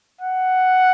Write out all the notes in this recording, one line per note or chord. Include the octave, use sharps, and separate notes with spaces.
F#5